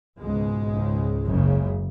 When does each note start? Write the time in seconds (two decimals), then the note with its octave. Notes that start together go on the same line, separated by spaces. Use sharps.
0.20 C#2 G#2 B2 G#3
0.72 C#2 C#3
1.24 F#1 F#2 C#3